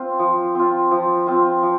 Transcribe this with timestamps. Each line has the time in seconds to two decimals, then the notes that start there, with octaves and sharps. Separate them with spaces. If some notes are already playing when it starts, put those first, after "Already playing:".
Already playing: C4 F4
0.19 F3
0.55 C4 F4
0.91 F3
1.27 C4 F4
1.63 F3